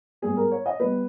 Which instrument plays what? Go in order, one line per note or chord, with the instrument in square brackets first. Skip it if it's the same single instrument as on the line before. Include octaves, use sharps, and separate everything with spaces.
[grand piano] G#2 G3 B3 G#4
A#4
C#5
D#5
G3 B3 B4